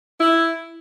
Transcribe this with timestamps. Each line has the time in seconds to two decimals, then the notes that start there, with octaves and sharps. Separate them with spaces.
0.20 E4